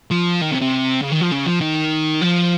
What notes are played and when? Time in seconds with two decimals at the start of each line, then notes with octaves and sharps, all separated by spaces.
0.11 F3
0.41 D#3
0.51 C3
0.61 C3
1.01 C#3
1.11 D#3
1.20 F3
1.31 C#3
1.46 F3
1.61 D#3
2.21 F3